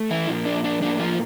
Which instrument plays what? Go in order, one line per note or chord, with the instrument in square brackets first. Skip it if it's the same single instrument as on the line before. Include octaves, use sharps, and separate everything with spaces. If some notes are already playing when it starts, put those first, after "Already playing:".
Already playing: [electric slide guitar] A3
E3 E4
A#2 F3 A#3
D4
D4
A2 F3 A#3 D4
F3 F4